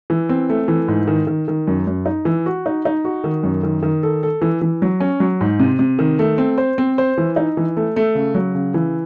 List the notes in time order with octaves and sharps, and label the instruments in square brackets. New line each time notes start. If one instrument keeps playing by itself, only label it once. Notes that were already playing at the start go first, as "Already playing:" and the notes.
[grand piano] E3
C4
A3
E3
G#2
D#3
D#3
D#3
F#2
F#2
D#4
E3
F#4
D#4
D#4
F#4
D#3
F#2
D#3
D#3
A4
A4
E3
E3
F#3
C#4
F#3
G#2
C3
C3
D#3
A3
C4
C5
C4
C5
E3
D#4
E3
A3
A3
C#3
F#3
C#3
E3